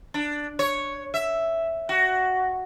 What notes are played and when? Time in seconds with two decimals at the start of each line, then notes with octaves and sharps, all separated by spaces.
0.14 D4
0.59 C#5
1.14 E5
1.89 F#4